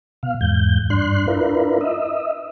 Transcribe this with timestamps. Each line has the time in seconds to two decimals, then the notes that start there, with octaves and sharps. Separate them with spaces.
0.23 B2 F5
0.41 E2 G#2 G6
0.90 G2 D4 C6 F#6
1.28 D4 E4 F4 A#4 B4
1.81 D#5 E5